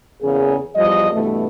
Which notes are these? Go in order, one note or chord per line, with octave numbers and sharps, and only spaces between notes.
E2 C#3 A#3 G#4
E2 F3 G3 D#5
G2 B2 E3 A3